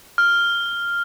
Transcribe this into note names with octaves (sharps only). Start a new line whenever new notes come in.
F6